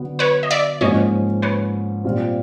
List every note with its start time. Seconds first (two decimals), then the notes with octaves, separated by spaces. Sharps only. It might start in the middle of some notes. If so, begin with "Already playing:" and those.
Already playing: D3 F#3 B3
0.19 B4 C#5
0.43 D#5
0.51 D5 E5
0.81 G#2 F3 A#3 C#4 C#5 D#5
1.42 B4 C#5
2.04 A#2 G3 C4 F4